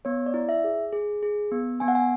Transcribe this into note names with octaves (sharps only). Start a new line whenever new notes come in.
B3 C#5
D5
E4
E5
G#4
G#4
G#4
B3
B3 G#5
F#5
G#5